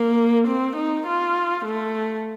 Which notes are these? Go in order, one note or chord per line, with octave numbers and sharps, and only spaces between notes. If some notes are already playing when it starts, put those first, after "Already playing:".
Already playing: A#3
C4
D#4
F4
A3